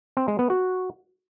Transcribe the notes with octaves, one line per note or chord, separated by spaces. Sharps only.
C4
G#3
B3
F#4